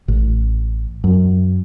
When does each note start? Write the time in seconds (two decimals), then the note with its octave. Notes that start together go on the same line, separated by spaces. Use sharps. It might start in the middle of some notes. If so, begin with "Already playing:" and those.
0.08 A1
1.04 F#2